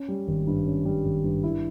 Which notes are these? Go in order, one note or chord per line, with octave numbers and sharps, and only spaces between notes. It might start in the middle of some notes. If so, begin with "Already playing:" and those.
Already playing: C#4
G3
G#1
G2
C#4
G3
G#1
G2
E4